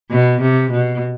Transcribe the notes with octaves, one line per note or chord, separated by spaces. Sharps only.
B2
C3
B2